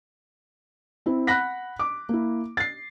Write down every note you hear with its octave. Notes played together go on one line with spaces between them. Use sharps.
C4 E4
F#5 B5 F#6 A#6 B6
D6
A#3 E4
A6 C7